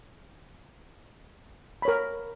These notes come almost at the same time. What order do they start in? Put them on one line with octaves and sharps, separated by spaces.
B5 C#5 A#4